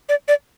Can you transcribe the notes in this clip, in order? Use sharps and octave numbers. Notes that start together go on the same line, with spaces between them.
D5
D5